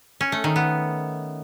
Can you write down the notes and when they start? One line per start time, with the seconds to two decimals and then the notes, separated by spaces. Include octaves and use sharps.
0.21 C#4
0.32 A3
0.44 D#3
0.56 B3